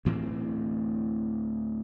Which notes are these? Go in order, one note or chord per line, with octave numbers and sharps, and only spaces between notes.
D2 A2 E3 C4